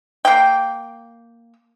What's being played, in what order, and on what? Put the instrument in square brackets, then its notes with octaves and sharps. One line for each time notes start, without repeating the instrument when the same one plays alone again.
[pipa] A#3 G5